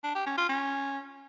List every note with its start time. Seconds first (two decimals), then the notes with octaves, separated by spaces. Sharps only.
0.03 D4
0.15 G4
0.26 C#4
0.38 F4
0.49 C#4